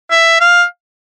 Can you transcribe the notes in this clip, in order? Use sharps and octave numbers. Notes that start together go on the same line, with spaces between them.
E5
F5